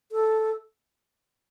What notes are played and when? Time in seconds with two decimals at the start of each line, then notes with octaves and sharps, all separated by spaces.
0.12 A4